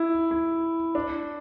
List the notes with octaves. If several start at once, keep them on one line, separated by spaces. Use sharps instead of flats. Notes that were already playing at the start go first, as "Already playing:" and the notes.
Already playing: E4
E4
D4